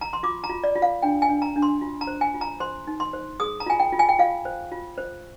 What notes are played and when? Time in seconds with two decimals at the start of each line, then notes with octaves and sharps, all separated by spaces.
0.01 A#5
0.13 C6
0.23 F4 D6
0.44 A#5
0.49 F4
0.64 D5
0.76 F4
0.82 F5
1.02 D4 G5
1.22 G#5
1.29 D4
1.42 A#5
1.56 D4
1.62 C6
1.81 F4
2.01 A#5
2.07 C5
2.21 G#5
2.34 F4
2.41 A#5
2.60 C5 C6
2.87 D#4
3.00 C6
3.13 C5
3.40 G#4 D#6
3.60 A#5
3.66 F4 G#5
3.80 G5
3.93 F4
3.99 G#5
4.09 G5
4.19 F4 F5
4.45 C5
4.72 F4
4.98 C5